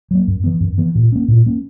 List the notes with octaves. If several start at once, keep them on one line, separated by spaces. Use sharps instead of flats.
F#3 A#3
F#2
E3 B3
F#2
E3 B3
A#2
A#3 C#4
A#2
A#3 C#4